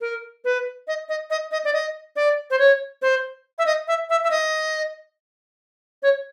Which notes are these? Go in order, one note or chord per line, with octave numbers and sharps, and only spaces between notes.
A#4
B4
D#5
D#5
D#5
D#5
D5
D#5
D5
C5
C#5
C5
E5
D#5
E5
E5
E5
D#5
C#5